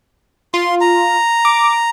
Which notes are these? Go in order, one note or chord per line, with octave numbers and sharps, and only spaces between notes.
F4 C6
A#5
D6